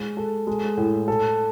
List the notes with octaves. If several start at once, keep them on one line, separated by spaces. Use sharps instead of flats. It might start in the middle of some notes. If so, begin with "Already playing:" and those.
Already playing: G#3
A4
G#3
A2
A4